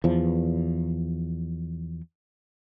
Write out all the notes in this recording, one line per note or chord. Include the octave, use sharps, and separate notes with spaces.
E2 F3